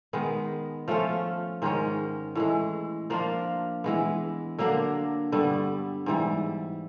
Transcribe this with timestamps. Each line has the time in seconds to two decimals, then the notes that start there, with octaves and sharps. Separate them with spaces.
0.13 D#3 G#3 B3
0.88 F3 A3 C#4 F4
1.62 G#2 D#3 G#3 C#4
2.35 A2 E3 G#3
3.10 F3 A#3 D4 F4
3.84 E3 G#3 B3
4.58 D3 F#3 A#3 D4
5.32 G2 D3 G3 B3
6.06 G#2 E3 G3